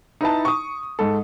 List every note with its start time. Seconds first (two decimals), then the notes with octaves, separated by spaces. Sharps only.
0.21 D#4 E4 B4 A5
0.45 C#6 D#6
0.99 G#2 A4